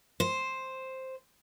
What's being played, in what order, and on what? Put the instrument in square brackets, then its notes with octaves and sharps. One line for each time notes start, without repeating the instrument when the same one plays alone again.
[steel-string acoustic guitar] C5